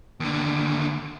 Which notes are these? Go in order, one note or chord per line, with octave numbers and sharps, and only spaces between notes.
D#2 D3